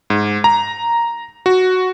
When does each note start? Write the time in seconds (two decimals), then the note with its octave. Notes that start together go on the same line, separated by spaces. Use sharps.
0.10 G#2
0.44 A#5
1.46 F#4